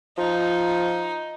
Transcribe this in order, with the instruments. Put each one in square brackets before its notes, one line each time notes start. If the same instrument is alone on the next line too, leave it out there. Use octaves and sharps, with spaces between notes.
[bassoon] F3 [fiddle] D#4